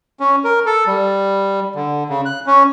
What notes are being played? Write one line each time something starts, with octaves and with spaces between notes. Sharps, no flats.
C#4
A#4
A4
G3
D3
C#3
F#6
C#4